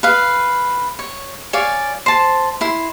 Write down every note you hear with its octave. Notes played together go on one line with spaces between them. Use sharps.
B4 F5
C#5
C#5 D5 F5 G#5
C5 A5
E4 C6